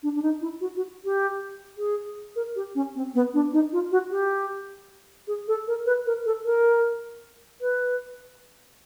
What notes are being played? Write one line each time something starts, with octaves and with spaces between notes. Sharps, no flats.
D4
D4
D#4
E4
F#4
F#4
G4
G#4
A#4
G4
C#4
C4
B3
D4
D#4
F4
F#4
G4
G#4
A4
A#4
B4
A#4
A4
A#4
B4